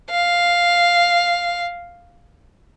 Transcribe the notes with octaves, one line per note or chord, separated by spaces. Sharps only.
F5